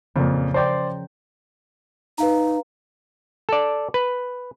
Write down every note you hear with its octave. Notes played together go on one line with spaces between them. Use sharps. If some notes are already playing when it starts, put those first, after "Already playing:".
F2 A#2 C#3 F3
A#4 C5 D5 G5 C6
D#4 B4 F5 A#5
A4 D5
B4